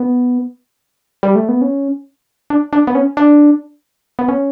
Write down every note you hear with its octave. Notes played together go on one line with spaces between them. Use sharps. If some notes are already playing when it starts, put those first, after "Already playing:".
Already playing: B3
G3
A3
B3
C#4
D4
D4
B3
C#4
D4
B3
C#4